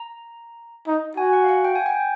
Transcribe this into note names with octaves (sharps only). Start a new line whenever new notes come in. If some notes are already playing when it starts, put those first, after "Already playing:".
Already playing: A#5
D#4
F#4 G#5
F#5
F5
F#5
G5
G#5
G5